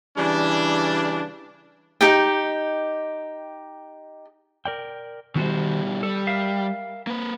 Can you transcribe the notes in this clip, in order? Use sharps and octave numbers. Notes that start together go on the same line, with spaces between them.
C#3 E3 G3 D4
D#4 G4 G5
A#4 D5 G5
B2 D#3 G3 F#4 C5
G3 A4
A#4 E5 F5
A#3 B4